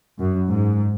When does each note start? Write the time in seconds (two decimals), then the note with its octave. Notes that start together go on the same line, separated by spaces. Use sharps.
0.19 F#2
0.51 G#2